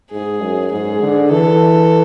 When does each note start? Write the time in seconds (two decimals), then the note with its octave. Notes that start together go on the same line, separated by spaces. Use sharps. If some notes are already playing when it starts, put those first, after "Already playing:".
0.11 G#2 G#4
0.41 F#2
0.72 G#2 G#4
1.01 D3
1.31 E3 A4